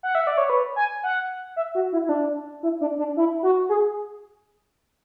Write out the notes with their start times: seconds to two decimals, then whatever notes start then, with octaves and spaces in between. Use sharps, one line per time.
0.03 F#5
0.15 E5
0.27 D5
0.38 C#5
0.50 B4
0.76 G#5
1.03 F#5
1.56 E5
1.75 F#4
1.92 E4
2.04 E4
2.09 D4
2.63 E4
2.81 D4
2.98 D4
3.17 E4
3.43 F#4
3.69 G#4